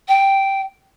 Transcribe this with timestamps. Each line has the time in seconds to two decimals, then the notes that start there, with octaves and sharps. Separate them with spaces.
0.08 G5